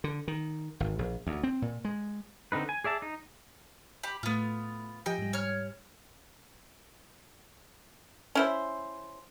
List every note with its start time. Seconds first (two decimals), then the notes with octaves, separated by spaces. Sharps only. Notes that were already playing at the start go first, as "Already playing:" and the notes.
0.04 D3
0.28 D#3
0.80 G#1
0.99 A#1
1.27 D2
1.43 C4
1.62 A#2
1.85 G#3
2.52 D3 C4 D#4 B4
2.69 G#5
2.84 G#4 D5 E5 A5
3.02 D#4
4.03 G4 B5
4.23 A2 A3 B3 F4
5.06 F3 G4 D#5 G5 G#5
5.18 G#2 G3
5.33 C#5 F6
8.35 C#4 E4 C5